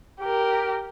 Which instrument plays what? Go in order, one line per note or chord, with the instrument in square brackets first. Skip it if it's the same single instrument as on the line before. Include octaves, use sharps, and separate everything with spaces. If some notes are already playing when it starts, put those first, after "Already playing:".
[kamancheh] G4 A#4